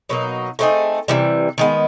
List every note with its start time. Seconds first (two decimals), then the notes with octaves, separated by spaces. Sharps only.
0.09 B2 F#3 A#3 D#4
0.59 A3 C4 D#4 G#4
1.08 C3 E3 G3
1.58 D#3 G#3 B3